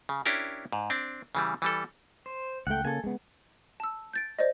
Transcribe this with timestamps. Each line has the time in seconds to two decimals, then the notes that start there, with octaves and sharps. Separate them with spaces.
0.09 C#3
0.26 C#4 D4 E4 G4 A#4
0.72 G#2
0.90 C4 D4
1.35 C#3 E3 G3
1.62 E3 G3 A4
2.26 C5
2.67 C#2 A3 F#5 G5
2.85 C#3 A#3 A4 G#5
3.04 C#3 G#3 B3
3.80 A5 E6
4.13 G6 A6 D7
4.39 C5 D5 D#5